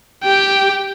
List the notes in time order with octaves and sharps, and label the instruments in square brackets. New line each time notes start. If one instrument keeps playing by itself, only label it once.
[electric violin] G4 G5